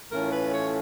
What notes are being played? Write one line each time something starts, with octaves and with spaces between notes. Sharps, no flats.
A2 E3 A3 C#4 F4 A#4
B4
C#5